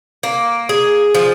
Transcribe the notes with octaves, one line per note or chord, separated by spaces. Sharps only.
A#3
G#4
F3